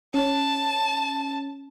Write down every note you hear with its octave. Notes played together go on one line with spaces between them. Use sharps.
C#4 A5